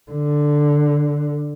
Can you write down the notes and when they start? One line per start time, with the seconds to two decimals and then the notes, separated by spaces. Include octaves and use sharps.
0.12 D3